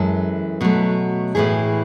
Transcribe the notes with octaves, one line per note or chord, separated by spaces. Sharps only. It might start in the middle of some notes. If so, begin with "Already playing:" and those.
Already playing: F#2 E3 G#3 A4
B2 F#3 A3
A2 E3 A3 G#4